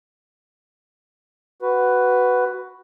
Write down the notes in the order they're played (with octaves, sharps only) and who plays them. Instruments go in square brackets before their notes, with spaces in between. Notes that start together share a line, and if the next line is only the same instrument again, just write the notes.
[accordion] F#4 B4